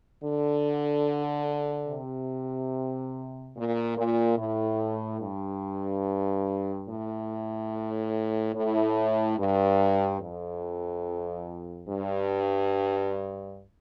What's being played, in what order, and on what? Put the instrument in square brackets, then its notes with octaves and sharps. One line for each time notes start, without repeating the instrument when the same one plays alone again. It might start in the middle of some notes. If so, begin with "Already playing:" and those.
[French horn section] D3
C3
A#2
A#2
A2
G2
A2
A2
G2
F2
G2